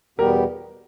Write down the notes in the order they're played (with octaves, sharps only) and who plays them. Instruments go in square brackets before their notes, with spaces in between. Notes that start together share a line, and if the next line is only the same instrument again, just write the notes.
[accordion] E2 B2 G3 B3 G4 [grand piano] A#4